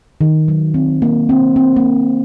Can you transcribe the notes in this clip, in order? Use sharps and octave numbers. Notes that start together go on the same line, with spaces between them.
D#3
F#3
C4
A#3
C4
C4
A#3